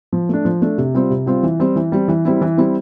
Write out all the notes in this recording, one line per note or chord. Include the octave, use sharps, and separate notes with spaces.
F3
A3 D4
F3
A3 D4
C3
G3 C4 F4
C3
G3 C4 F4
E3
G3 C4
E3
G3 C4
E3
G3 C4 E4
E3
G3 C4 E4